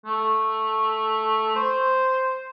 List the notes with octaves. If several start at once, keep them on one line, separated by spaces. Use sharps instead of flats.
A3
C5